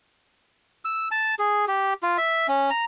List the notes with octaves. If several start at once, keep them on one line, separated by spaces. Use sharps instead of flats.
E6
A5
G#4
G4
F4
E5
C#4
A#5